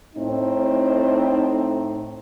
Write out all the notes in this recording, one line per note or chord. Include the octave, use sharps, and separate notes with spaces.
A2 C4 D#4